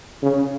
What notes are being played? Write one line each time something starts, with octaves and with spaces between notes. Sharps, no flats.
C#3